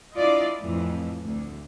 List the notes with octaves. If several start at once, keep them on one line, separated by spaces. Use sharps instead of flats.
D4 E4 F4 D5 D#5
F2 A2 E3
D2